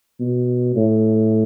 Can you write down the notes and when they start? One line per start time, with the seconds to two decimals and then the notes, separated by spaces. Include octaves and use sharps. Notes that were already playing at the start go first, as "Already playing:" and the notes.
0.20 B2
0.76 A2